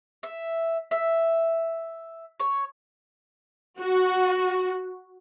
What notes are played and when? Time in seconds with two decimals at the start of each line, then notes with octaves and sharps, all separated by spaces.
0.23 E5
0.91 E5
2.40 C#5
3.80 F#4